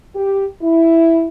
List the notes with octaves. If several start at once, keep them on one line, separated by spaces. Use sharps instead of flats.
G4
E4